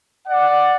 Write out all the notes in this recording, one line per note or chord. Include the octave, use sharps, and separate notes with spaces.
D5 F#5